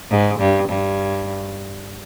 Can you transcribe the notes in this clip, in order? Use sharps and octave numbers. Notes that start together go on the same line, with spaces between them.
G#2
G2
G2